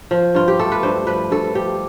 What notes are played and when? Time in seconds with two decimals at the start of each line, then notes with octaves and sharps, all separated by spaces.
0.11 F3
0.35 G2 F4
0.48 G4
0.59 A3 A4
0.72 B4
0.83 G2 C5
1.06 F3 B4
1.31 G2 A4
1.55 F3 G4